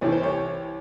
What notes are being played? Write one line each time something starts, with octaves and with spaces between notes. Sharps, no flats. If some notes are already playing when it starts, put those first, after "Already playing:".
C2 C3 E3 C#5
C5
C#5